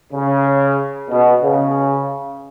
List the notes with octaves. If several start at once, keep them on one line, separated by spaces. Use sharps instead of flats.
C#3
B2
C#3